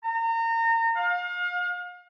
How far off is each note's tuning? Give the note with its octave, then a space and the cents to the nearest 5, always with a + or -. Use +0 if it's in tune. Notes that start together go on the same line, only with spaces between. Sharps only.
A#5 -30
F5 +35